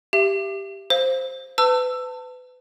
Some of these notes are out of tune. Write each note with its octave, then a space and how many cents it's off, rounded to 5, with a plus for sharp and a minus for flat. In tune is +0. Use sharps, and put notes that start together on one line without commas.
G4 +0 E5 +25
C5 +5 F5 +0
B4 +30 A5 +30 E6 +10